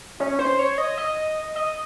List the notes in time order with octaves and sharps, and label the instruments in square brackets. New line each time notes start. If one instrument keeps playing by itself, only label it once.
[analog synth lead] C#4
C5
C#5
D#5
D#5
D#5